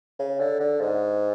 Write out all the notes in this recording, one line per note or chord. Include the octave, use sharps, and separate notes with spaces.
C#3
D3
D3
G#2